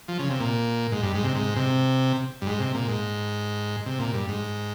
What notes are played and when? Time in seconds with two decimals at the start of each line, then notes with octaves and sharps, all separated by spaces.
0.08 F3
0.19 C#3
0.30 C3
0.40 A#2
0.92 G#2
1.03 G2
1.14 G#2
1.24 C3
1.35 G#2
1.56 C3
2.42 G2
2.47 G#2
2.60 C3
2.75 A#2
2.88 G#2
3.86 C3
4.00 A#2
4.14 G2
4.28 G#2